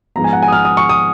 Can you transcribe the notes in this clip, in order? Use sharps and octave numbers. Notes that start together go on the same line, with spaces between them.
G#2 F3 B3 A#5
G#5
F#5
G#5
D#6
F6
D#6
C#6
D#6